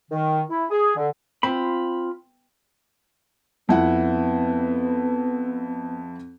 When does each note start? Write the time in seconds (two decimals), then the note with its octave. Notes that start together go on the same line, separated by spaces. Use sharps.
0.11 D#3
0.50 E4
0.71 G#4
0.97 D3
1.43 C4 F4 B5
3.69 F2 B3 E4 F#5